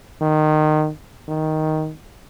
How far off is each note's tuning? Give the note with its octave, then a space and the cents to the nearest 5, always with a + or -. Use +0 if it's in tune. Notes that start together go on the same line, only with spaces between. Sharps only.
D#3 -20
D#3 +5